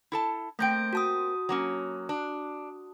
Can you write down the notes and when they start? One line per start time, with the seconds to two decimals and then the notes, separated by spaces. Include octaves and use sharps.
0.12 E4 A4 A5
0.59 A3 A#3 C4 G5 G6 D7
0.93 F#4 A5 D#6
1.49 F#3 A#3 C#4
2.09 D4